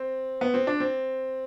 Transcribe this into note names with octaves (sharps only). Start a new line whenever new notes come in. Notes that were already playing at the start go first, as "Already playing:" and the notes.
Already playing: C4
B3
C4
D4
C4